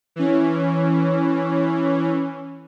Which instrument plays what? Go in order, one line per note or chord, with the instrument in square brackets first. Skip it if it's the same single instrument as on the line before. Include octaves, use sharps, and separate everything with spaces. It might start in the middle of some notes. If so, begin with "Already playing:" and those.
[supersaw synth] E3 C#4